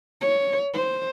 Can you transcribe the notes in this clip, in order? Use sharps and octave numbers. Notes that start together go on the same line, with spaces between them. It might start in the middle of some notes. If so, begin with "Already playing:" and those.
C#5
C5